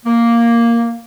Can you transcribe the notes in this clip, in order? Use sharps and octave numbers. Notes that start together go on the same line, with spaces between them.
A#3